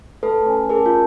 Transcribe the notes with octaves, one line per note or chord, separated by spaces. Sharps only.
A3 A4 B4
C#4
D4 G#4 A#4
F4